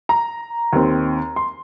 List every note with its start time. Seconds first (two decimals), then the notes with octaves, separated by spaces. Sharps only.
0.09 A#5
0.73 D#2 D#3 C4
1.36 C6